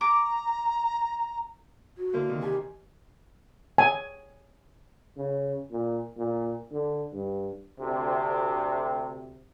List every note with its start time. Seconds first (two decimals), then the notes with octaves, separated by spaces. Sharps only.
0.01 A#5 D6
1.98 F#4
2.14 D3 A#3 E4 C5
2.28 C3 D#3
2.42 G4 G#5
3.78 G#5
5.17 C#3
5.72 A#2
6.17 A#2
6.72 D3
7.13 G2
7.80 D2 C3